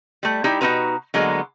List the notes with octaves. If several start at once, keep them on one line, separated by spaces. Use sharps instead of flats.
G3 A3
G3 D#4 E4 G4
B2 D#4 E4 F#4 B4 A#5
D3 F#3 G#3 A#3 B3